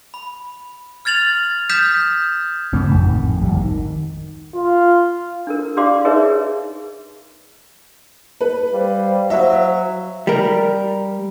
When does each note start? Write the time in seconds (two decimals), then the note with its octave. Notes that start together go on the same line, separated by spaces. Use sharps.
0.14 B5
1.05 F6 G#6 A6 F7 F#7
1.69 D#6 F6 G6 G#6 B6 E7
2.73 F#2 C#3 A3 C4
2.91 G#1 F2 A2 D#3
3.41 G#1 D2 G3
3.57 D#3
4.55 F4
5.47 D4 A4 A#4
5.77 D4 G4 D5 F5 C6 D6
6.05 D#4 G#4 A#4 B4 C#5 E5
8.41 B4
8.72 G3 C5 F5
9.30 F#3 E5
10.27 G3 A#4